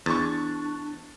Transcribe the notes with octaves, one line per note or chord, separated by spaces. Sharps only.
E2 D4 C#6 A6